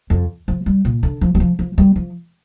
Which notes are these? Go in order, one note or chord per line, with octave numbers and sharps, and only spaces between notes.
F2
F3
G3
A#2
D3
F3
G3
F3
F3
G3
F3